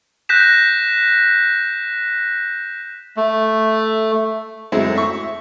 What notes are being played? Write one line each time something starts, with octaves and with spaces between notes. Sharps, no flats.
F#6 G6 A#6 B6 E7
A3
F#2 G#3 A3 C4 E4
E5 C#6